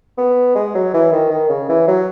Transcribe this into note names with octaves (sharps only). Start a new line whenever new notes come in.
B3
G#3
F#3
E3
D#3
D#3
C#3
E3
F#3